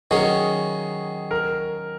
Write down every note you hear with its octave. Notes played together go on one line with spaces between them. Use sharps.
D#3 F#3 C#4 G#4
A#4